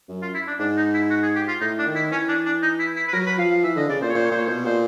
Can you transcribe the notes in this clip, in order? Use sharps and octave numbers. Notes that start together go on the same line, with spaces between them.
F#2
F4
E4
D4
G#2 D4
D#4
E4
F#4
G#4
G4
F4
A2 D#4
D4
D#3
E4
E3 C#4
D4
D4
D#4
E4
E4
B4
F#3 A#4
B4
F3 F5
F5
E3 E5
D3 D#5
C#3 D5
A#2 C5
C#5
A#2 C5
C#5
A#2 C5
C#5
B2 C5
A#2 C5